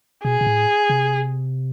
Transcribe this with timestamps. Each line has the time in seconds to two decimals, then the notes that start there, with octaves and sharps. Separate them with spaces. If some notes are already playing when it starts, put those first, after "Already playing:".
0.24 B2 G#4
0.41 B2
0.47 A2
0.90 C3